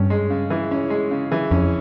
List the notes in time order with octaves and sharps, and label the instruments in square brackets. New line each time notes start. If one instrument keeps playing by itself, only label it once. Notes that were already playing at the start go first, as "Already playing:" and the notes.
Already playing: [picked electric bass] G2 [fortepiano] C#4
[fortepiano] G#3
C#3
E3
C#4
G#3
C#3
E3
[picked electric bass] F2 [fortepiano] C#4